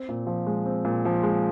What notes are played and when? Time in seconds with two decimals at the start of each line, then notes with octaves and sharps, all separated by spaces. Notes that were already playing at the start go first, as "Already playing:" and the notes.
Already playing: C4
0.09 A#2
0.27 F3
0.47 G#3
0.66 C4
0.85 A#2
1.05 F3
1.23 G#3